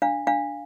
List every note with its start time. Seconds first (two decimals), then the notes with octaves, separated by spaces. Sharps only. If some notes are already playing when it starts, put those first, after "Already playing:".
0.02 D4 F5
0.27 D4 F5